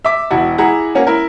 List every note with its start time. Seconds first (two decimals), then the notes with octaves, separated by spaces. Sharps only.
0.05 E5 D6
0.30 E1 E4 F#4
0.58 E4 G#4 F#5 A#5
0.95 A#3 C#4 F#4
1.07 E4 A#4